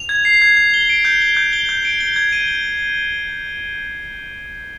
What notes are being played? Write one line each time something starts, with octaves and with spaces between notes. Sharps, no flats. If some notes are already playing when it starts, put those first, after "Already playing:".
Already playing: F7
G#6
C7
G#6
G#6
G7
D7
G6
G7
G6
G7
G6
D7
G7
G#6
D#7
G7